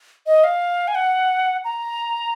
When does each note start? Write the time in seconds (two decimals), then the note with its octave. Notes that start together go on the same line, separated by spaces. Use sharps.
0.26 D#5
0.44 F5
0.87 G#5
0.95 F#5
1.64 A#5